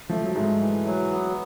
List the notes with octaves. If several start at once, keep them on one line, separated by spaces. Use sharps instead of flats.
F3 A3
F#3
G#2 G#3 A3
E3
F#3
B3